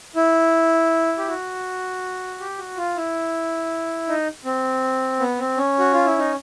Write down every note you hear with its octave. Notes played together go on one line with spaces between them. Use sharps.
E4
G4
F#4
G4
F#4
F4
E4
D#4
C4
B3
C4
C#4
F#4
F4
E4
D#4